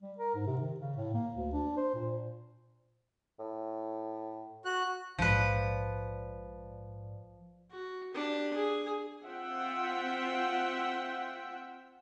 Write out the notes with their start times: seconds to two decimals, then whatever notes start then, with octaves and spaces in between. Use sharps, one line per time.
0.02 G3
0.18 A#4
0.35 G#2
0.46 C3
0.61 D#3
0.80 C#3
0.96 A2
1.14 A#3
1.35 D2
1.53 D4
1.77 C5
1.94 A#2
3.40 A2
4.65 F#4 F#6
5.19 A#1 G#2 F3 B4 D5
7.71 F#4
8.14 D4 G4
8.54 G#4
9.25 C4 F4 E5 F#5 G5